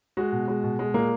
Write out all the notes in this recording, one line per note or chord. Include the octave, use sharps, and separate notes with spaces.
G#3 F#4
B2
G#3
B2
G#3
A#2 A#3